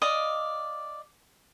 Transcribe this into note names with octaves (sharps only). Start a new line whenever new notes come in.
D5 D#5 F5